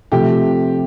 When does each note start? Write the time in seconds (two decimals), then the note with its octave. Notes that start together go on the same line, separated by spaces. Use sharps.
0.12 C3 F3 A3 G4